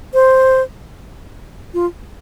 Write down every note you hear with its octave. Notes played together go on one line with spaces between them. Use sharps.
C5
F4